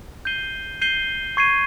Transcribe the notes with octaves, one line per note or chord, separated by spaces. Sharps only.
G6 C7 D#7 G7
G6 C7 D#7 G7
C#6 G#6 C7 D#7